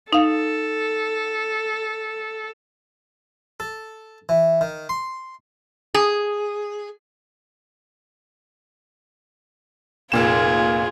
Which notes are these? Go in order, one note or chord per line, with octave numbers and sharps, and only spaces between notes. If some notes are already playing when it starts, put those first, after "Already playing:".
D#4 A4 F5
A4
E3
D#3
C6
G#4
F1 A#2 F4 G#4 E7